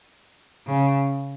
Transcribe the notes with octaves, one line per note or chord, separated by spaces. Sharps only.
C#3